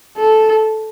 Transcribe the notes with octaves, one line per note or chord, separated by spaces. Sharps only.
A4